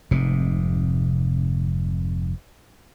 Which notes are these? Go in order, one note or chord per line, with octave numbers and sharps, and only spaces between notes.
F1 G#2 C3